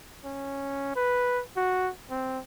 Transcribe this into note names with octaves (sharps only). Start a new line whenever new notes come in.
C#4
B4
F#4
C4